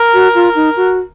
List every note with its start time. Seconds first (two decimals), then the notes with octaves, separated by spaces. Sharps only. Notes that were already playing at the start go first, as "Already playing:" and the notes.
Already playing: A#4
0.14 F#4
0.35 F4
0.55 D#4
0.76 F#4